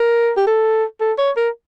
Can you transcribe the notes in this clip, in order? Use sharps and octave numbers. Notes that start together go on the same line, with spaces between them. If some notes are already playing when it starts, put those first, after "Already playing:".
Already playing: A#4
G4
A4
A4
C#5
A#4